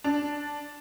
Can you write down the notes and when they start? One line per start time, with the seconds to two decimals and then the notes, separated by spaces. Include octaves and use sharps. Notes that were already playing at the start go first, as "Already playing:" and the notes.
0.04 D4